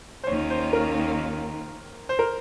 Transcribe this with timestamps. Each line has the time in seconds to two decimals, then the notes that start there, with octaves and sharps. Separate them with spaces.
0.24 C5
0.27 D#2 D#3 A#3 C#4 F4 C#5
0.50 C5
0.73 A#4
2.09 C5
2.19 A#4